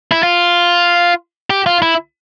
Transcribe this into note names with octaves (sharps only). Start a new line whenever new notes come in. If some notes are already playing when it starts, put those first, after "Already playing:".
E4
F4
G4
F4
E4